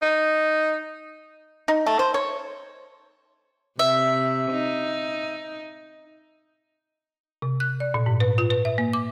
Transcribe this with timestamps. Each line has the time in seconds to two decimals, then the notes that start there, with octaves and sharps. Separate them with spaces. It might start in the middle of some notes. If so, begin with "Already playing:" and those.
0.02 D#4
1.68 D#4
1.86 A3
1.99 C5
2.14 C#5
3.79 C3 E5
4.52 D#4
7.42 C3
7.60 F#6
7.80 D5
7.94 A#2
8.06 G#2
8.20 B4
8.38 F4
8.50 B4
8.65 E5
8.78 A#3
8.93 D6